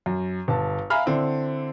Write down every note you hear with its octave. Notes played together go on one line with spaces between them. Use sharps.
F#2
G1 A5
E5 F5 G#5 A#5 B5 F6
D3 C4 E4